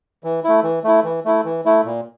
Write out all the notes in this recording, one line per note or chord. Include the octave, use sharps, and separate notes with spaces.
E3
A3 E4
E3
A3 E4
E3
A3 E4
E3
A3 E4
A#2